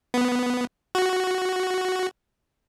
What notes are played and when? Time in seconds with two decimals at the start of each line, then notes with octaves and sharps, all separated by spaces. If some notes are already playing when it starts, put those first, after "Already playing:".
0.14 B3
0.95 F#4